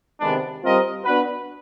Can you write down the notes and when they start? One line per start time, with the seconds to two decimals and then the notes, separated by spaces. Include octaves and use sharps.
0.21 C3 D#3 G#3 B3 D4
0.64 G3 C4 F4 A#4 D#5
1.05 B3 D4 F#4 B4